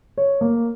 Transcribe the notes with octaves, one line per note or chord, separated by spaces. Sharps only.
C#5
A#3